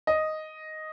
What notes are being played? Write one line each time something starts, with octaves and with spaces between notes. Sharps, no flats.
D#5